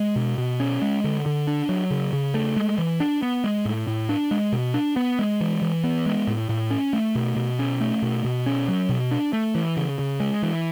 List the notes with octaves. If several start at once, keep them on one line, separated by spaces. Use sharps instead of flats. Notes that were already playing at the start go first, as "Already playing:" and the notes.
Already playing: G#3
B2
B2
C#4
G#3
D3
D3
D4
F#3
C#3
C#3
A3
G#3
E3
D4
B3
G#3
A2
A2
D4
G#3
B2
D4
B3
G#3
E3
E3
B3
G#3
A2
A2
C#4
A3
B2
B2
C#4
A3
B2
B2
C#4
F#3
B2
D4
A3
E3
C#3
C#3
G#3
E3